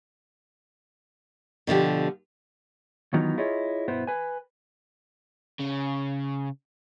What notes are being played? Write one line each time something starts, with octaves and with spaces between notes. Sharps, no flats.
B2 D3 F3 G4
D#3 E3 F#3 B3 D#4 F4
E4 F4 G#4 C#5 D#5
B1 G2 B3 E4 C5
B4 G#5
C#3